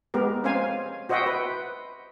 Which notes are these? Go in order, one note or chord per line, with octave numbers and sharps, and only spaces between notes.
G#3 B3 G4 A#4
C4 C#4 C5 F5 G#5
F#4 C5 D#5 E5 F#5 G5
B4